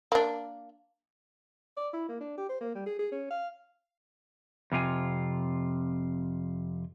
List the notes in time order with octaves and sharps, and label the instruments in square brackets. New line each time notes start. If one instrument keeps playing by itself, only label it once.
[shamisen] A#3 D4
[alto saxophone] D5
E4
A#3
D4
G4
C5
A#3
G3
G#4
G#4
C#4
F5
[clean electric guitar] F2 C3 F4 G#5